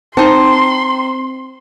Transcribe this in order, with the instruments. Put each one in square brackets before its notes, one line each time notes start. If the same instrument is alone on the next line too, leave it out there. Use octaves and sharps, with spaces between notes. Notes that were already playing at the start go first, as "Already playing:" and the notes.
[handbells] C4 [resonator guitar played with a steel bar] D#4 A5 [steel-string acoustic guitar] C5 [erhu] C6